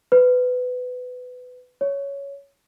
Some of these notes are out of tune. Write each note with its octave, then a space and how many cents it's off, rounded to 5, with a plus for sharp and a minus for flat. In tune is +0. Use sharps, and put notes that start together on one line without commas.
B4 +20
C#5 +10